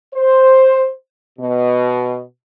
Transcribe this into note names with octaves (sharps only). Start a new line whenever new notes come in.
C5
B2